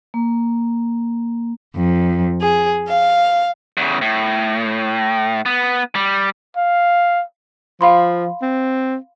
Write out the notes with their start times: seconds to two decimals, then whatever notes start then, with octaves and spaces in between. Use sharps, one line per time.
0.14 A#3
1.76 F2
2.41 G#4
2.88 F5
3.77 E2 C#3
4.01 A2
5.46 B3
5.95 G3
6.57 F5
7.81 F3 F5 B5 C6
8.42 C4